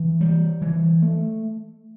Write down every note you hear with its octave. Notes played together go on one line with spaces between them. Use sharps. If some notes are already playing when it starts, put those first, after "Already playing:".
Already playing: E3
G3
E3
A3